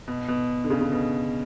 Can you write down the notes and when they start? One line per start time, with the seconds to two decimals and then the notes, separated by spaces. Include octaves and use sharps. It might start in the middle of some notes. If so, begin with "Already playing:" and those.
0.08 B2
0.28 B2
0.64 D3
0.70 C#3
0.81 C#3
0.92 B2